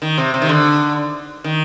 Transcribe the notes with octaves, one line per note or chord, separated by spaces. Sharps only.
D#3
C3
C3
D#3
D3
D#3